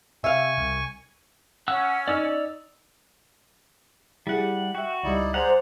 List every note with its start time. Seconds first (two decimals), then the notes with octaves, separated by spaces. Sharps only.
0.24 C3 E5 F5 G#5 C#6
0.58 C2
1.68 C#4 F#5 E6 F#6
2.08 D#4 D5 E6 F6
4.27 G3 E4 G4 G#4 F#5
4.75 F#4 E5 G5
5.03 C#2 G3 D#4 E4 D5
5.34 G#4 C5 D5 F#5 A#5